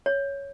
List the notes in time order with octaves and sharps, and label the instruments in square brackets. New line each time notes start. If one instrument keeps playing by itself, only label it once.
[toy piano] C#5